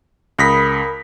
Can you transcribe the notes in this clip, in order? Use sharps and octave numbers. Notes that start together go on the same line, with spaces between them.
C#2 A#4 B5 D#6 A#6 B6